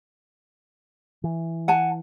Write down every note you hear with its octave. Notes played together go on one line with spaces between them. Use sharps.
E3
F#5 G#5 A5